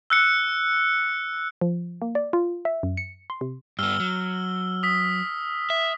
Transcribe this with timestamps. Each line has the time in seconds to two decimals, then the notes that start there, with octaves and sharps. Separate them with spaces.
0.10 E6 F#6 C#7
1.61 F3
2.02 A#3
2.15 D5
2.33 F4
2.65 E5
2.83 F#2
2.97 C#7
3.30 C6
3.41 C3
3.79 G2 B3 E6 F6 G7
4.00 F#3
4.83 D#6 B6
5.70 E5